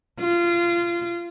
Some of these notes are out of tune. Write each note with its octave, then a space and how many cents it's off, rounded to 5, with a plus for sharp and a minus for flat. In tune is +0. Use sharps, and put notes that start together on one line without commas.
F4 -20